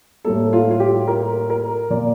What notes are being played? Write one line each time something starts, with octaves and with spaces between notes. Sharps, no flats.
A2 G3 A#3 A4
F4
F4
G4
A#4
A#4
A#2 F3 A#3 D5